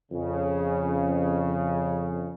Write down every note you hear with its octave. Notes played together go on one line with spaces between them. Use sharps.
F2 C#3